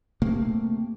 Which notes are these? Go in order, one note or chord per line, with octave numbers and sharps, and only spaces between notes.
C3 A3 A#3